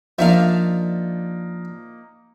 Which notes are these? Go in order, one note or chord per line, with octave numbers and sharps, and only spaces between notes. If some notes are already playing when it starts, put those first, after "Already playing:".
F3 A#3 D4 D#4 E5 F5